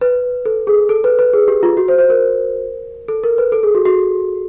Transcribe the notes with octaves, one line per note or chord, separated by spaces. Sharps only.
B4
A4
G#4
A4
B4
B4
G#4
G4
F4
F#4
C5
C5
A#4
A4
A#4
B4
A4
G#4
F#4
F#4